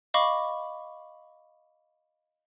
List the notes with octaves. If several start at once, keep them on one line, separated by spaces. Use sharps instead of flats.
D#5 F5 B5 C#6 D6